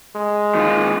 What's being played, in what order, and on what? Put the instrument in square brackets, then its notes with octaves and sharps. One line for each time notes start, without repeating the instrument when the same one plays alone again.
[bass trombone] G#3
[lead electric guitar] D#3 F4